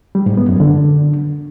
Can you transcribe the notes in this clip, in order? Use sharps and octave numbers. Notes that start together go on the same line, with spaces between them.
G3
G#2
B3
F#2
D3